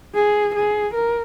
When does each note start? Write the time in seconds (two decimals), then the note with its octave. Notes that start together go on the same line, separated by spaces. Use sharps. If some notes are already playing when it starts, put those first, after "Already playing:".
0.15 G#4
0.55 G#4
0.94 A#4